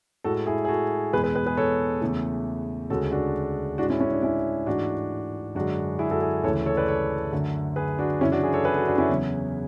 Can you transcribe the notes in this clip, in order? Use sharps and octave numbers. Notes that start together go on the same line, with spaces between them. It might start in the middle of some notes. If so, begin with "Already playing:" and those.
A2 G#3 F#4 A4
E4 G#4
G#4
F#4 A4
E2 B2 G#3 G#4 B4
G#4 B4
G#4 B4
G#4 B4
A4 C#5
E2 C#3 E3 A3
D2 C#3 G#3 F#4 A4
D4 F#4
A2 G#3 D4 F#4
C#4 E4
C#4 E4
D4
C#4 E4
G#2 E3 A3 D4 F#4
F#2 D3 G#3 D4 F#4
E4 G#4
F#4 A4
E4 G#4
D2 C#3 E3 A3 A4 C#5
A4 C#5
B4 D5
A4 C#5
F#2 D3 F#3 A3
G#4 B4
D4 F#4
F#2 C#3 E3 C#4 E4
D4 F#4
E4 G#4
A4 C#5
G#4 B4
F#4 A4
D4 F#4
C#4 E4
E2 C#3 F#3